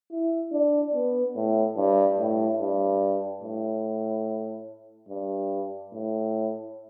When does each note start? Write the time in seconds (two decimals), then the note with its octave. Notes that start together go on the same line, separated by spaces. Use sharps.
0.11 E4
0.52 D4
0.94 B3
1.36 A2
1.77 G2
2.18 A2
2.60 G2
3.43 A2
5.09 G2
5.93 A2